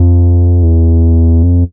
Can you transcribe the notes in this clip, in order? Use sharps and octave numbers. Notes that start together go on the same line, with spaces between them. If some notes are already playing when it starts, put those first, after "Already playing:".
Already playing: F2
E2
F2